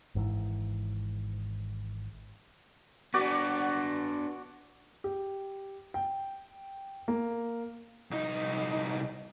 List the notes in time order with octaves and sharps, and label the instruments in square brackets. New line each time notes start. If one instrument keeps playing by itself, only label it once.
[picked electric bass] G#1 G#2 D3 E3
[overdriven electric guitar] B3 D4 [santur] F#4 D5 F#5
[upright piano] G4
G5
A#3
[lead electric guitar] C2 D#4